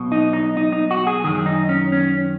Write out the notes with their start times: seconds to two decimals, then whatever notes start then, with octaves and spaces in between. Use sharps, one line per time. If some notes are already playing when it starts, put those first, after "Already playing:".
Already playing: B1 B2
0.12 D#4
0.33 D#4
0.57 D#4
0.73 D#4
0.91 F#4
1.07 G#4
1.24 F#2 D#3 G#4
1.46 D#4
1.69 C#4
1.92 C#4